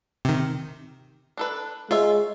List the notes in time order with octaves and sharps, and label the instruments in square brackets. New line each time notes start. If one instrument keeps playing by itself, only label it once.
[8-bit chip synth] C3 D#3
[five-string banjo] D4 A4 B4
[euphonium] G#3 [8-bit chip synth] F4 [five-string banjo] C#5 E5